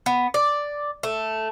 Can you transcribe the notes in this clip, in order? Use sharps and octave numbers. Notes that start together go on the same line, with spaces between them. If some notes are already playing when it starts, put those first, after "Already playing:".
B3
D5
A3